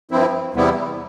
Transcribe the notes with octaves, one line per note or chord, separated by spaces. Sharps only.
G2 F3 C4 E4
E2 C3 G3 B3 E4